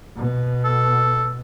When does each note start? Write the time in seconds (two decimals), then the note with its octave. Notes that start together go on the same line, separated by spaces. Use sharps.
0.16 B2
0.65 A4